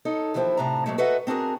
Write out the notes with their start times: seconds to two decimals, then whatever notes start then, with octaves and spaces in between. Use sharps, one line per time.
0.05 D#4 A4 C#5
0.34 D#2 E3 F3 E4 C5 G5
0.57 A2 C3 D4 E5 A#5
0.86 A#2 C#3 F#3 G#3 A3
0.98 F#4 A4 B4 D#5 E5 F#5
1.27 C4 D4 F#4 G#4 A#4